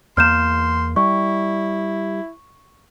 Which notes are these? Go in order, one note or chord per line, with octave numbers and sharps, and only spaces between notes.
E2 A#3 C6 F6 G6 E7
G3 E4 C#6